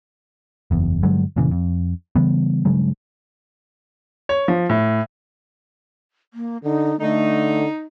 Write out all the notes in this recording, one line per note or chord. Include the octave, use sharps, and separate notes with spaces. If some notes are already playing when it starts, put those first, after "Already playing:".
F#1 E2
G2 D3 F#3 G#3
F1 A#2 C#3 E3
F2
C#3 E3 G3 B3
G2 C#3 F#3 G#3
C#5
F3
A2
A#3
D3 D#4
D3 A3 D#4